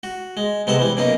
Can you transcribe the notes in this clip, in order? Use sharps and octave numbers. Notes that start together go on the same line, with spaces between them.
F#4
G#3
C3 G#3 B3 A4 A5
E3 G3
F#2 B2 A#3 D#4